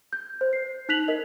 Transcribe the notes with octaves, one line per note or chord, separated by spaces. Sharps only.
G6
C5
C7
D#4 F#6 B6 F7 F#7
A#4 D#5